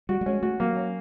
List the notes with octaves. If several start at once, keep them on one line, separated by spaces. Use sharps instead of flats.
G3 F#4
G3
G#3 C#4
A3 F#4
F#3 A#3
C#4